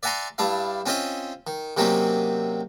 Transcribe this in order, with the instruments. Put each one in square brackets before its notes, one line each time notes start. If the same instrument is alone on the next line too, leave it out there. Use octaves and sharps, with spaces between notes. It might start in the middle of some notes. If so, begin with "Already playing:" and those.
[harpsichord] D5 E5 F#5 G#5 A#5 C6
G2 D4 E4 F5
C4 C#4 F4 C5 D#5 E5
D#3
C3 D#3 F#3 A#3 C4 C#4